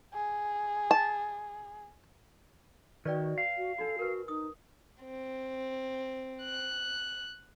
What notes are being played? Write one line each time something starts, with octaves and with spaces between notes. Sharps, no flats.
G#4
A5
D#3 F#4 B4 D5 G5
F5
F#4
D4 D#4 F#4 A4
F#4 A#4 B4
D#4 D#6
C4
F#6